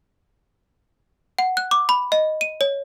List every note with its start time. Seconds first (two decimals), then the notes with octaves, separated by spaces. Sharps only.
1.39 F#5
1.57 F#6
1.71 D6
1.89 B5
2.12 D#5
2.41 D#7
2.61 C#5